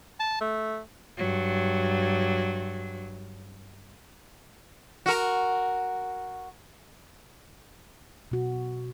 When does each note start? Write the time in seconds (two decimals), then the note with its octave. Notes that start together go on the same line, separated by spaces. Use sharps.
0.19 A5
0.41 A3
1.17 G2 F#3
5.06 F#4 A#4
8.31 B2 F#4